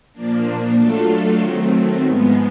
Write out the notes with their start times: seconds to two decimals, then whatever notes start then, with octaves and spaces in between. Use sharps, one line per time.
0.13 A#2 F3 A#3 D4
0.76 F#3 A3 D4 F4 A4
1.39 D#3 F#3 A3 C4
2.03 G#2 F3 G#3 B3